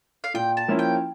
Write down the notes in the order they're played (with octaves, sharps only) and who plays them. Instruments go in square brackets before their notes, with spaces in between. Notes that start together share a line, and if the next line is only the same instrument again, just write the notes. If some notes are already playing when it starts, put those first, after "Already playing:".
[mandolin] F5
[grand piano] A#2 [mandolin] G5
[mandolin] A5
[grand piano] F3 A#3 C#4 E4
[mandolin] G5